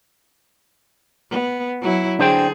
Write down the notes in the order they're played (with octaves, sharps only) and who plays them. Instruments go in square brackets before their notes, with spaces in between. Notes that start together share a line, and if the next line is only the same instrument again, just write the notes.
[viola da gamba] B3
F#3 E4
[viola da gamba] D3 G#4 [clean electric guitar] D4 C5 G5